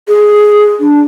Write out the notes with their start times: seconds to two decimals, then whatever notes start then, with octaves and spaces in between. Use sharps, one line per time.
0.08 G#4
0.80 D4